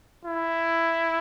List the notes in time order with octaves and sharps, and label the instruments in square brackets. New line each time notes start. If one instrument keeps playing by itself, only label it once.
[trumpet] E4